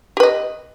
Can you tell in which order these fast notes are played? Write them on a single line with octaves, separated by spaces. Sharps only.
G4 B4 D#5